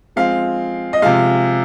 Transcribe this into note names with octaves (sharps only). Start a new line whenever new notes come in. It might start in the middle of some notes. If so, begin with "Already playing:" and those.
F3 G#3 C4 F5
D#5
C3 F3 G#3 F5